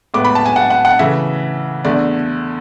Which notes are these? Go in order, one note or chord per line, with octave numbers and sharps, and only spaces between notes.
A2 G#3 B3 D6
B5
A5
G#5
F#5
F#5
F#5
C#3 E3 A3 E5
E2 D3 A3 D5